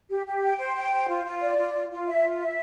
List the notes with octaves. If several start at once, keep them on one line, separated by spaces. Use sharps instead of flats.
G4
G4
G5
C5
G5
C5
F4
F4
D5
F4
F4
F4
E5
F4
E5